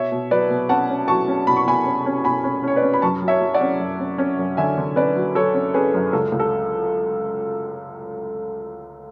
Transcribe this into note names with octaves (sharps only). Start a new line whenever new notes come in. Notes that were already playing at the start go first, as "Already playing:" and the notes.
Already playing: B2 C#5 E5
B2
F#3 B4 D5
B2
C#4 F#5 A5
C#4
F#3 A5 C#6
C#4
B2 B5
C#6
B2 G#5 B5
C#4
C#4
B2 G#5 B5
C#4
C#4 C#5
B4 D5
C#4
B5
F#2 A5 C#6
F#3
C#5 E5
F#3
D5 F#5
C#4
F#2
C#4
C#4
F#2
D3 E5 G#5
D3
C#4 B4 D5
F#3
F#3 A4 C#5
C#4
C#4 G#4 B4
F#2
C#2 A4
C#2
A4